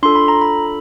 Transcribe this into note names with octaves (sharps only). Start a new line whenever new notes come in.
D4 F4 A4 C6
B5
A#5
B5